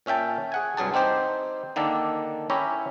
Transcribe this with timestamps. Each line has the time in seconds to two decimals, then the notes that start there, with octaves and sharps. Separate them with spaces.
0.06 A#2 C#4 E5 G5 A5
0.52 G#4 F#5 G#5
0.77 C2 G2 F#3 G#4 A5
0.94 C4 D#4 G4 C5
1.76 D3 D#3 A#3 D4 A4 D5
2.50 C#4 E4 G4 C#5 E5 A#5